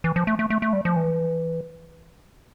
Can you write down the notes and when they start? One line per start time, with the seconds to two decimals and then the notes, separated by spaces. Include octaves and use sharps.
0.04 E3
0.16 F3
0.27 A3
0.39 A3
0.50 A3
0.62 A3
0.73 G3
0.85 F3
0.96 E3